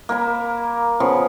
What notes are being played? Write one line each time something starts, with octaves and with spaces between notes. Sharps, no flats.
A#3 A#4 B5
C#3 F3 B3